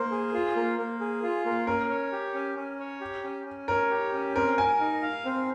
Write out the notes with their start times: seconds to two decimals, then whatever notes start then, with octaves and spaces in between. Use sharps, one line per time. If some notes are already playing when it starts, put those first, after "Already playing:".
Already playing: A#3 C5
0.11 G#4
0.34 F4
0.56 A#3
0.78 A#3
1.00 G#4
1.23 F4
1.45 A#3
1.67 C#4 A#4
1.90 C#5
2.12 G4
2.34 C#4
2.56 C#4
2.80 C#5
3.01 G4
3.24 C#4
3.46 C#4
3.68 A#4 C#5
3.91 G4
4.13 C#4
4.35 C4 A#4
4.58 A#4 G#5
4.80 D#4
5.02 F5
5.25 C4